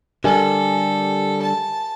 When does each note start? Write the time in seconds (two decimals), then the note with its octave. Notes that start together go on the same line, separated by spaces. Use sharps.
0.24 D3 G3 G4 A4 A#4 G#5
1.42 A5